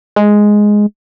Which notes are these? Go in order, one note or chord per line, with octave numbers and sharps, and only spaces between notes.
G#3